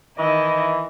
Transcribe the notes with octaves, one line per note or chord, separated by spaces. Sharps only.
D#3 E3 E4 D#5